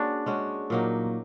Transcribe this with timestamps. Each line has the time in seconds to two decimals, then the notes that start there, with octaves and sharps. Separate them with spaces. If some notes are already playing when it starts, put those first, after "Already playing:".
Already playing: G#3 A#3 C#4 D4 F#4
0.26 G#3 C#4 F#4
0.70 A#2 F#3 A#3 D#4